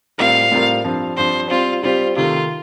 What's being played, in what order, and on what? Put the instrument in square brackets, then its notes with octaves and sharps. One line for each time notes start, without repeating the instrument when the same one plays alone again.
[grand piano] A2 G3 C4 F4 A#4 [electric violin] F5
[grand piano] A2 G3 C4 F4 A#4
G2 F3 C4
[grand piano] G2 F3 C4 [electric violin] C5
[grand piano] G3 C4 G4 C5 [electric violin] F4
[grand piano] G3 C4 G4 C5 [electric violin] F4
[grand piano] C3 D#3 A3 [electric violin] F4